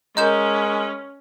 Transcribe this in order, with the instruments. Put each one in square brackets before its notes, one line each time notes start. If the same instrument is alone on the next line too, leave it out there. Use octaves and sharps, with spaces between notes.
[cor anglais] G#3 [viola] C#4 [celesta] A#4 A#5 [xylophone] D#5 G6 E7